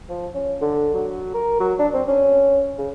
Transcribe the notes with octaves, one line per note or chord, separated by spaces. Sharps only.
F3
C#4
D3
F#3
A#4
F#3
D4
C4
C#4
C#3